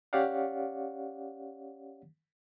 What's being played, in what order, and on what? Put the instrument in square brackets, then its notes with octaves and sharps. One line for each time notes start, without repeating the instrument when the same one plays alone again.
[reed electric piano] C#4 G4 C#5 D5 F5 F#5